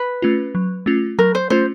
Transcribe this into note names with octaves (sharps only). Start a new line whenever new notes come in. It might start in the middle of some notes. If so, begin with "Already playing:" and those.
Already playing: B4
A3 C#4 F4
F#3
A3 C#4 F4
F#3 A#4
C5
A3 C#4 F4 C5